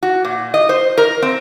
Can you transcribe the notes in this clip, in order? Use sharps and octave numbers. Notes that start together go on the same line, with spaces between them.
F#4
A#2
D#5
C5
A#4
C4